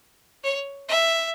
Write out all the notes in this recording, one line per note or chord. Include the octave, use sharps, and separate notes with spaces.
C#5
E5